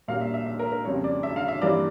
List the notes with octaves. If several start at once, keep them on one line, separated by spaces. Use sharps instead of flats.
A#2 G3 A#3 C#4 F5
E5
E5
E5
A#4
A#4
F2 C#3 G3 A#3 C#4 C#5
D5
E5
F5
E5
G2 E3 G3 A#3 C#4 D5